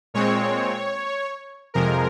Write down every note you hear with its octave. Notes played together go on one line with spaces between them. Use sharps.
A#2 G#3 C4 C#5
F2 C3 F3 G#3 A#4